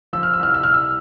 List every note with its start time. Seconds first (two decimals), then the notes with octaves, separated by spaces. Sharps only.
0.13 F3 E6
0.23 F6
0.34 E6
0.39 C2 F6
0.54 E6
0.63 C2 F6
0.74 E6